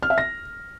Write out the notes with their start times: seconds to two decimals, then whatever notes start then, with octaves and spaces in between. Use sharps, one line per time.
0.03 F6
0.10 E5
0.18 A#6